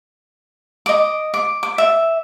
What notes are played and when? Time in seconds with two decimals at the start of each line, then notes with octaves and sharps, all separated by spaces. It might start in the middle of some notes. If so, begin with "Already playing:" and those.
0.86 D#5 D6
1.34 D6
1.63 D6
1.78 E5